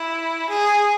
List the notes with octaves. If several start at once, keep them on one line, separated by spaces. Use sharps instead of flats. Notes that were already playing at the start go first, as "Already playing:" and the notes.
Already playing: E4
G#4